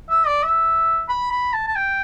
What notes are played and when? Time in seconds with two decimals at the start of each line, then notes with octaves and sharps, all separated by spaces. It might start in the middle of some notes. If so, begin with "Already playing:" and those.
0.10 E5
0.27 D5
0.43 E5
1.09 B5
1.32 B5
1.53 A5
1.68 A5
1.76 G5